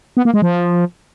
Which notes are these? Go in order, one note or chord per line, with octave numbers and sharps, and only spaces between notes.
B3
A#3
G#3
F3